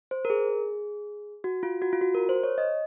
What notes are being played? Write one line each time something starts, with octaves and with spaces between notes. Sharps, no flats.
C5
A#4
G#4
F#4
F4
F#4
F4
F#4
A#4
C5
C#5
D#5